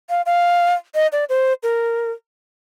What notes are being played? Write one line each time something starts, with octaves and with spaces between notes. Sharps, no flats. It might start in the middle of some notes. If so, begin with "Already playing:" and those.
F5
F5
D#5
D5
C5
A#4